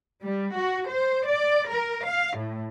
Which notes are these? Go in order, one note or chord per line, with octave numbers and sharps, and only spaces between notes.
G3
F#4
C5
D5
A#4
F5
A2